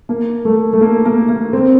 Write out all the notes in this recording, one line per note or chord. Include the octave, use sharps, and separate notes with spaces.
A#3
A3
A3
A#3
A#3
A#3
C4